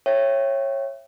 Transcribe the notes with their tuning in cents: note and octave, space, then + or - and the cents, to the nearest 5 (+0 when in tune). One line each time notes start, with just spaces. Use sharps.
C#5 -20 E5 +20 G5 -15